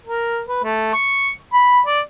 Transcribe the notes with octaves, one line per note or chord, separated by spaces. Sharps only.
A#4
B4
A3
C#6
B5
D5